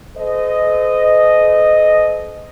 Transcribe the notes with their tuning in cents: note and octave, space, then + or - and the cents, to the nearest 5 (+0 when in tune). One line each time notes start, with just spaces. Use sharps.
A4 -45 C5 -40 D#5 -5